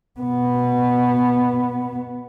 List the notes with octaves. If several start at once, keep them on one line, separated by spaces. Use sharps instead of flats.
B2 B3